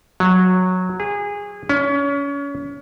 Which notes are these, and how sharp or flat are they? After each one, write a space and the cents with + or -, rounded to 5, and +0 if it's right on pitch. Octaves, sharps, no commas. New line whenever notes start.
F#3 -10
G#4 -25
C#4 +30